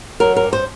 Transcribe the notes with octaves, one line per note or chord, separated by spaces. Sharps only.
F#3 A#4
A#4
G2
C5